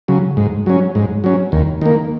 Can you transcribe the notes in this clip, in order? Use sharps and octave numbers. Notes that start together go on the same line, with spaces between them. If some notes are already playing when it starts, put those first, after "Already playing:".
C#3 F#3
G#2
F#3 C#4
G#2
F#3 C#4
D#2
D#3 A#3